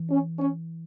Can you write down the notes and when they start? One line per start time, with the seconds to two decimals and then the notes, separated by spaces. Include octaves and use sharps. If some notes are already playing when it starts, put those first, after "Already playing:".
Already playing: E3
0.10 C#4
0.39 C#4